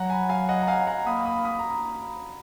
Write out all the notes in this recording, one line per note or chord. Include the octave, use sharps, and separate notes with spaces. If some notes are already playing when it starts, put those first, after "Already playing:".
Already playing: F#3 F#5 A#5
G#5 B5
F5 G#5
D#5 F#5
A#5
F5 G#5
F#5 A#5
A#3 B5 D#6
B5 D#6
B5 D#6
A#5